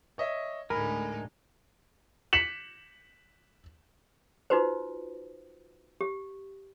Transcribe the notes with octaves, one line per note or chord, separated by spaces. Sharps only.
C#5 D#5 E5
D2 A2 G#3 D#4 A#4 G#5 B5
B6 C#7 E7 F#7
D#4 F4 F#4 B4 C5
G4